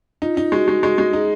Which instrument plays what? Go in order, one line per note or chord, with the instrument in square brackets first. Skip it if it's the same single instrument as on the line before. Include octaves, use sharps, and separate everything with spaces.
[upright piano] D#4 [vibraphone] F4
[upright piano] D#4
[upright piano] G#3 [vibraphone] F#4
[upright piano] G#3
[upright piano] G#3 [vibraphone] F#4
[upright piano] G#3
[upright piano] D#4 [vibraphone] G#4